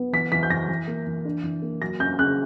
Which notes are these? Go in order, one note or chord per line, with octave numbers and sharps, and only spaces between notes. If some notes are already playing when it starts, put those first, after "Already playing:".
Already playing: B3
E3 B6
E3 B6
G6
E3 A#6
E3
A#3
E3
D4
E3
A#3
F#3 A#6
C#4 G6
C#3 F#6